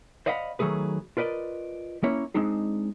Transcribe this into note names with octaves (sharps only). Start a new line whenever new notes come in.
C5 D5 D#5 F5 F#5 B5
D#3 F#3 A3 G#4 B4
F4 A#4 B4 D5 D#5
A#3 C#4 E4 C#5
G#3 C4 D4 D#4 G#4